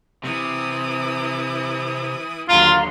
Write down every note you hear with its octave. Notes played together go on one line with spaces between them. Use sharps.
C3 E3 E4 D#6
D#2 D3 F#3 F4 F5 A#5 C6